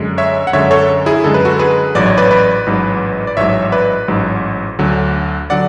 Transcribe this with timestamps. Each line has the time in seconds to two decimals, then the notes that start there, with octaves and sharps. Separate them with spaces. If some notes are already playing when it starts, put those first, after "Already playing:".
Already playing: F#2 D3 G#3
0.18 C#5 E5
0.47 F#5
0.53 F#2 D3 G#3 C#5 E5
0.71 A4 C#5
1.06 E4 G#4
1.24 F#2 D3 G#3 A4
1.34 B4
1.45 F#4 A4
1.59 G#4 B4
1.95 A1 G#2 F#3 D5
2.06 C#5
2.17 B4 D5
2.31 B4 D5
2.66 A1 G#2 F#3
3.27 D5
3.37 A1 G#2 F#3 C#5 E5
3.65 E5
3.72 B4 D5
4.08 A1 G#2 F#3
4.79 D2 D3 F#3
5.50 D3 F#3 D5 F#5